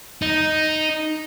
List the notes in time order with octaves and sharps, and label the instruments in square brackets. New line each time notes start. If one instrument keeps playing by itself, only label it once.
[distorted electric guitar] D#4